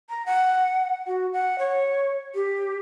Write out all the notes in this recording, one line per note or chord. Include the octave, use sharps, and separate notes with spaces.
A#5
F#5
F#4
F#5
C#5
G4